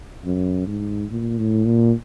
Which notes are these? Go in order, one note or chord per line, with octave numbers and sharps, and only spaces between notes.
F#2
G#2
A#2
A2
A#2